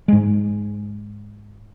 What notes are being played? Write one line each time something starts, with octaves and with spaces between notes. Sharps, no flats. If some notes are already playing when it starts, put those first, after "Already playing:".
G#2 G#3